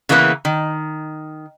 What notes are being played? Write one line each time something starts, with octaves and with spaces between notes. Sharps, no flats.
C#3 E3 A#3 B3 D#4 B4
D#3